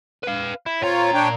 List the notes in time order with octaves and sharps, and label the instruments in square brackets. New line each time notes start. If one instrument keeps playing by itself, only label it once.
[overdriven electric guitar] B4 F5
E4
[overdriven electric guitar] A#2 A#5 [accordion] C4 F4 C#5
[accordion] D4 C#5 G5